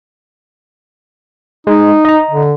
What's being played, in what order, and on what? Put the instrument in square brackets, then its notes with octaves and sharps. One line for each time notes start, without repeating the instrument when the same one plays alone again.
[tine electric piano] G#3 [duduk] D#4
[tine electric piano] D#5 A#5
[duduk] D3